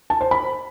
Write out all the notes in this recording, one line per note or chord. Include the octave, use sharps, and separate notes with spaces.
A5
C5
B5